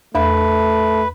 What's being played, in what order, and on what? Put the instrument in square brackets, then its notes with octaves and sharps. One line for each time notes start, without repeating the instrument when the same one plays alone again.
[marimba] E2 E5 B5 [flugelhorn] A3 [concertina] B4